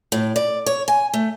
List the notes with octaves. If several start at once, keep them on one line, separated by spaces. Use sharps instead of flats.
A2
D5
C#5
G#5
A3